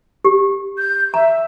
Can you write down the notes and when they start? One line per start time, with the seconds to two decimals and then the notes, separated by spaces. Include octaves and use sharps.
0.24 G4
0.78 G6
1.14 E5 A#5